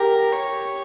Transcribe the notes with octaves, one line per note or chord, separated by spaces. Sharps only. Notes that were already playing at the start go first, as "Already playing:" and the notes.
Already playing: G4 A#4
C#5